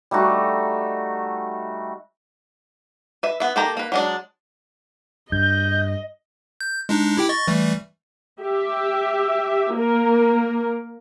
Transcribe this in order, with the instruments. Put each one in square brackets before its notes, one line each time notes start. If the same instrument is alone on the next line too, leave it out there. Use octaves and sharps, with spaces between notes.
[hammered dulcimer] G3 A3 D#4 F#4
[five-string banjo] B4 E5
B3 E5
D#3 A#3 G4 A4 A#5
A#3 B4
F#3 G#3 D4
[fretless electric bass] G2 [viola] D#5 [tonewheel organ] G6
[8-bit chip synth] G6
G#3 D4 D#4
E4 G4 G5
D#5 C#6 A6
E3 G3 A3
[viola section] G4 E5
A#3 A#4